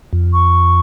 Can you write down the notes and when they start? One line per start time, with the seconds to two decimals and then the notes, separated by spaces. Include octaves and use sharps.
0.13 F2
0.33 C#6